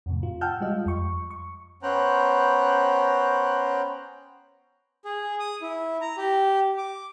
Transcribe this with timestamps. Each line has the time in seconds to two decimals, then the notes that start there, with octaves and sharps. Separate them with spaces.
0.06 F2 A2 C3
0.23 F4
0.41 F#5 G5 A5 E6 F6 G6
0.61 G3 G#3 F4 D#5
0.86 F2 C#6
1.31 C#6
1.83 B3 C#4 C5 G5 A#5 F#6
5.05 G#4
5.40 D#6
5.62 E4
6.01 A#5
6.17 G4
6.78 D6